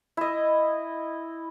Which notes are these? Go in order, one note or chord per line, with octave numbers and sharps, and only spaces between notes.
E4 D#5